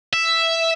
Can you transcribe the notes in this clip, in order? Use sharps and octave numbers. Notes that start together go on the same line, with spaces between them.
E5